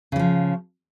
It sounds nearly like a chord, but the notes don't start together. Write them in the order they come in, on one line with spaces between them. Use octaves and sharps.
C#3 E3 F3